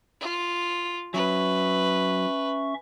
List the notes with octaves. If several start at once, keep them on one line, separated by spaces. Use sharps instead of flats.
F4
F#3 C#4 B4 E5 C#6